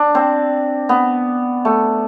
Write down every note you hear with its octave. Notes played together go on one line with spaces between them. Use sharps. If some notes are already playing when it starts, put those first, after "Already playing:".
Already playing: D4
C4
B3
A3